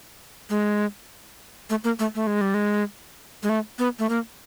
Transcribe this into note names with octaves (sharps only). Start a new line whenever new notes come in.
G#3
A3
A#3
A3
A3
G#3
G3
G#3
G#3
A3
B3
A3
A#3